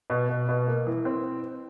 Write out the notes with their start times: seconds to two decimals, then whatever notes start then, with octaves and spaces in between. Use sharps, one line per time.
0.10 B2
0.29 B2
0.49 B2
0.67 A#3
0.87 E3
1.05 C4